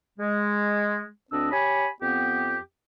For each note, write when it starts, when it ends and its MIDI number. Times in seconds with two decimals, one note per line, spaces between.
0.19 1.06 56
1.31 1.48 38
1.31 1.48 60
1.31 1.48 62
1.31 1.48 75
1.31 1.48 88
1.52 1.88 67
1.52 1.88 73
1.52 1.88 80
1.52 1.88 83
2.01 2.57 41
2.01 2.57 59
2.01 2.57 60
2.01 2.57 67